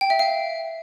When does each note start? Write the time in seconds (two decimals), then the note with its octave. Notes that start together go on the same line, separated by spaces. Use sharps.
0.01 G5
0.10 E5
0.19 F5